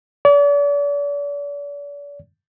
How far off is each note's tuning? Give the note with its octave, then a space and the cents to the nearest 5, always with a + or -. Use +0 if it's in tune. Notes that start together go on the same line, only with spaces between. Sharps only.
D5 -40